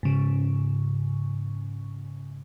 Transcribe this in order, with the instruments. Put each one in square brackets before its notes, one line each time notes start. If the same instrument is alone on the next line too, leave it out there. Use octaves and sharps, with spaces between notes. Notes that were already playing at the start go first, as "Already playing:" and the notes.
[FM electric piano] G#2 C#3